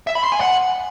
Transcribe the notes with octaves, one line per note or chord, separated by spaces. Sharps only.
E5
B5
C6
G#5
F#5